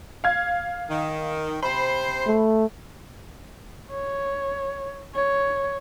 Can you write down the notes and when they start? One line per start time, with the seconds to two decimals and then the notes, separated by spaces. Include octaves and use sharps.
0.24 F5 G#6
0.89 D#3
1.63 C3 C5 B5
2.27 A3
3.91 C#5
5.15 C#5